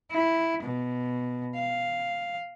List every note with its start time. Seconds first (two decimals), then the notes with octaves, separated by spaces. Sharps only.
0.11 E4
0.63 B2
1.55 F5